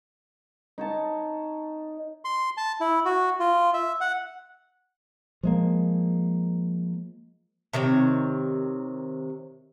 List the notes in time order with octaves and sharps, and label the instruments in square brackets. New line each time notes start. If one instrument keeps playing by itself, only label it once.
[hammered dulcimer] D#4 C#5 A5
[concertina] C6
A5
E4
F#4
F4
E5
F#5
[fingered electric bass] F3 G#3 A#3
[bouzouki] C3 D#3 C4 C#5